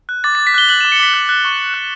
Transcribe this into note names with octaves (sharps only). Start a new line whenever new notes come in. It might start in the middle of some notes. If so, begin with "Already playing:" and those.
F#6
D6 A6
A6
D6
B6
F#6 G7
F#6 F#7
E7
D6
C#7
D6 B6
F#6
F#6
C#6
C#6
F#6